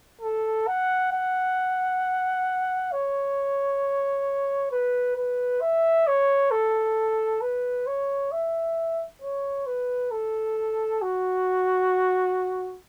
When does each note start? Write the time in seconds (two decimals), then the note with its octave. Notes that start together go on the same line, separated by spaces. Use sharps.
0.21 A4
0.67 F#5
1.12 F#5
2.92 C#5
4.71 B4
5.16 B4
5.61 E5
6.07 C#5
6.51 A4
7.41 B4
7.87 C#5
8.31 E5
9.22 C#5
9.66 B4
10.11 A4
11.02 F#4